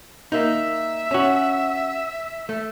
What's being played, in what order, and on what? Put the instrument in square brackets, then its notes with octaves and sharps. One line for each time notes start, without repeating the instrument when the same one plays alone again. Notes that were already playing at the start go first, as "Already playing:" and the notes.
[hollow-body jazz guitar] A#3 D#4 [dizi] E5
[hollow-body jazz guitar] C#4 F#4
A3